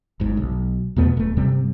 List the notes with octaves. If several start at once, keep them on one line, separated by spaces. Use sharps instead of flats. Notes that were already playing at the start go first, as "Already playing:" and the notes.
G1 G#2
B1
E2 B2 A3 B3
D1 A3
G2 C3 G3 C4